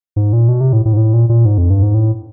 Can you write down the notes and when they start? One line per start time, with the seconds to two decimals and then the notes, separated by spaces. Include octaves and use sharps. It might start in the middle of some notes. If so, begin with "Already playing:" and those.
0.16 G#2
0.33 A#2
0.48 B2
0.61 C3
0.73 A2
0.85 A2
0.93 G#2
0.97 A2
1.13 A#2
1.29 A#2
1.45 G#2
1.58 F2
1.70 G2
1.82 G#2
1.94 A2